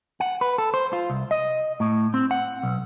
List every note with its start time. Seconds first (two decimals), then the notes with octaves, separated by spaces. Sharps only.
0.20 F#5
0.41 B4
0.58 A4
0.74 C5
0.93 F4
1.10 C2
1.31 D#5
1.80 A2
2.14 C4
2.31 F#5
2.63 B1